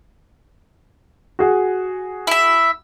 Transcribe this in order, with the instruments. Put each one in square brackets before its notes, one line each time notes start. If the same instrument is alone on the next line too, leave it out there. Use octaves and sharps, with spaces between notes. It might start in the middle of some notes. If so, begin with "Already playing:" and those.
[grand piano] F#4 G#4 F#5
[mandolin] E4 E5